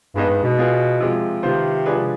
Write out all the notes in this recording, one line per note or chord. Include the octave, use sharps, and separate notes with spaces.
G2 G#3 B3 D#4 B4
G2
B2
B3 F4 G#4 B4
C3 F3 G#3
C3 D#3 B3 F4 C5
F3 G#3 D4 G#4 B4